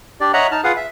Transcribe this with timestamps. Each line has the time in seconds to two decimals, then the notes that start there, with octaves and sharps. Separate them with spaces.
0.21 D4 G4 D5
0.33 C#5 D#5 E5 F#5 A#5 F#6
0.51 D#4 A5 F6
0.64 F4 G#4 B4 F5 F#5 D#6
0.77 E5